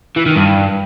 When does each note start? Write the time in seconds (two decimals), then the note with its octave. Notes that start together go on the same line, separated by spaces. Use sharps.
0.16 E3
0.26 D#3
0.36 G2